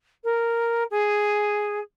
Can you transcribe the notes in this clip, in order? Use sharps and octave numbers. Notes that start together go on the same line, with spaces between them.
A#4
G#4